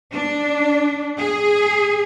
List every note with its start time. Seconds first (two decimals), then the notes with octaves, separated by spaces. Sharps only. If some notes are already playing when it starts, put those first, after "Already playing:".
0.13 D4
1.18 G#4